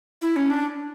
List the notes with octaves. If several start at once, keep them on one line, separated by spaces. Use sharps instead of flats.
E4
C#4
D4